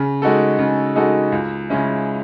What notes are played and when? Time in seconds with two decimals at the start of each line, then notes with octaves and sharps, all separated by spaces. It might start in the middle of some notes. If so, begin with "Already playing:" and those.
Already playing: C#3
0.22 G#3 D#4 F#4 A4
0.59 C#3
0.95 G#3 D#4 F#4 A4
1.32 C#2
1.70 C#3 G#3 C#4 E4